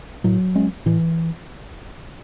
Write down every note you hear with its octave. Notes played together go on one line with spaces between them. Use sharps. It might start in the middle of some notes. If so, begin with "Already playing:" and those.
A2 F#3
G#3 C#4
A2 E3